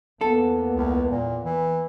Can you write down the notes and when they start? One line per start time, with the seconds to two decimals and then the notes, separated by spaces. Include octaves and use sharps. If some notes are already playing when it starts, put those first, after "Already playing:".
0.21 E2 A#3 B3 A4
0.74 C#2
1.11 A#2
1.44 E3